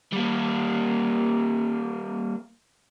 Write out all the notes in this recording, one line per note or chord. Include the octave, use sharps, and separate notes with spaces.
G3 A#3